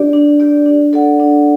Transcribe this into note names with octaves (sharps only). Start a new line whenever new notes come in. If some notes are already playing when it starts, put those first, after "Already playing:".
Already playing: D4 G4 D5
D4
G4 D5
D4
A4 D5 F#5
D4